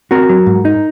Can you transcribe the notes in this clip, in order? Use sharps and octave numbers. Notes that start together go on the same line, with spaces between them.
C4 F#4 A#4
F#3
G#2
D#4